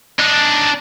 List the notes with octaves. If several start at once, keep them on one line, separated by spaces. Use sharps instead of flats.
D4 D#4